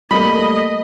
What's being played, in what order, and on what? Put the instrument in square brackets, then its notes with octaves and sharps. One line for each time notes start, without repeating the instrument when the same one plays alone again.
[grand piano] G3 A3 A#3 [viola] D#5 [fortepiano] B5